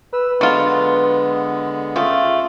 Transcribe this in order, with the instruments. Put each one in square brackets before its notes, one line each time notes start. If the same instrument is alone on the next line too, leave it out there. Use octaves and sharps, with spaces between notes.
[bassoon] B4 [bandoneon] E6
[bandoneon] D3 G#3 B3 [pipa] F#3 F4
[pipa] C#3 A3 [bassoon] F4